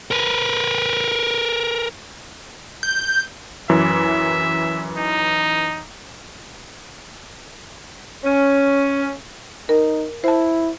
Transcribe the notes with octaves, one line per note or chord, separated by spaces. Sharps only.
A#4 B4
G6
F#2 E3 E5
D#4
C#4
D#4 A#4
E4 C5 A5